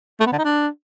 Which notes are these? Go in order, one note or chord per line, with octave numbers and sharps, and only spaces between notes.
A3
B3
D3
D#4
D4